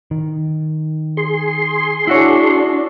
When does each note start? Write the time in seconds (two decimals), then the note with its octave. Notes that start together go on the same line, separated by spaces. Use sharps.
0.11 D#3
1.17 G#4 C6
2.07 D4 E4 F#4 C#5